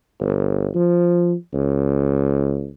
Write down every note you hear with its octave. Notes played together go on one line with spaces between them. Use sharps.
G1
F3
C#2